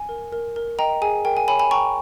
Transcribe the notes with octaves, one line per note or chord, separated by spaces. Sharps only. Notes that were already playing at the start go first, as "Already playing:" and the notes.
Already playing: G#5
A#4
A#4
A#4
D#5 G5 A#5
G#4 G#5
A#4 G5
G#5
C#5 G#5 B5
G#5 B5
G5 A#5 C#6